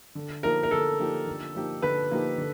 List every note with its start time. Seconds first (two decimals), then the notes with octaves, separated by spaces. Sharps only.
0.15 D3
0.43 F3 A#3 D#4 G4 A#4
0.63 A#4
0.71 D3 A4
1.00 F3 A#3 D#4 G4
1.27 D3
1.55 F3 A#3 D#4 G4
1.82 D3 B4
2.11 F3 A#3 D#4 G4
2.38 D3